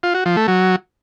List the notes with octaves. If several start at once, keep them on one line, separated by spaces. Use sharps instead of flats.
F4
F#4
F3
A3
F#3